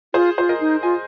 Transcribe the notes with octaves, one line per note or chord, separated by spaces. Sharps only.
F4 G#4 C5
F4 C5
A#4 D#5
D#4
F4 D#5 G#5